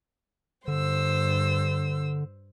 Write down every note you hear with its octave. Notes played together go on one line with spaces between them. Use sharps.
G2 D3 C5 E6